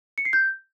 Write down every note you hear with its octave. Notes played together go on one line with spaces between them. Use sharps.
C#7
C7
G6